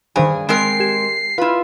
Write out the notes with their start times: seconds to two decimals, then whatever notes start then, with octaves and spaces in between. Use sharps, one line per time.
0.16 G2 D#3 G#4 C5 D5
0.49 G#3 C4 A#4 C7
0.80 G4 G#6 E7
1.38 E4 F4 B4